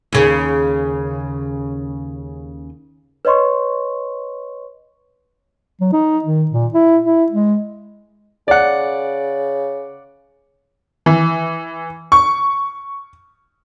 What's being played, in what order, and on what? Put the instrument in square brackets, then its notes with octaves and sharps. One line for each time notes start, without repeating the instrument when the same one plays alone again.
[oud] D#2 C#3
[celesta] B4 C#5 D#5 C6 C#6
[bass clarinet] F#3
D#4
D#3
A#2
E4
E4
G#3
[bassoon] C#3 [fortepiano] D5 F#5
[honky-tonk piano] E3
C#6